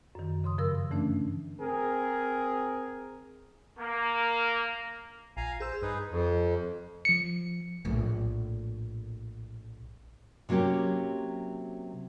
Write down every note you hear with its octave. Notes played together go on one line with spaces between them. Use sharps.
F#2 D#3
C#3 C6 D#6
G2 F3 A#4 E6
D3 E3 A3 C#4 D4
C4 G#4 A#4
A#3
A#1 F5 G#5 A#5
G#4 C5 E6
G2 D#4 G#4 B4
F2
F3 C#7
A#1 A2
C3 F#3 A#3 C#4 G4